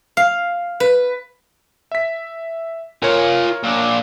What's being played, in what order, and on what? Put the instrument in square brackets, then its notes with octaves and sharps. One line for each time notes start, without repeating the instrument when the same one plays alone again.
[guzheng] F5
B4
[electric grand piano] E5 B6
[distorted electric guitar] F4 G#5 [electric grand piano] A#4 C#5
[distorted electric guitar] A#2 D4